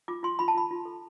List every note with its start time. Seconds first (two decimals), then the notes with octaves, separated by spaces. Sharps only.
0.08 F4 D6
0.23 F4 C6
0.39 F4 B5
0.48 A5
0.54 F4 B5
0.71 F4
0.85 A4